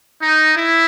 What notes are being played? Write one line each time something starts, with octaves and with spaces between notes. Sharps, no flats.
D#4
E4